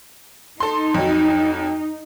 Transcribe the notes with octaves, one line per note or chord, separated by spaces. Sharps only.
D#4 A4 C6
F2 F#3